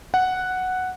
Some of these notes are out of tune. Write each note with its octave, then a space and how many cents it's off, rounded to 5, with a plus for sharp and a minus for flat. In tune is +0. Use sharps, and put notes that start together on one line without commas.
F#5 +0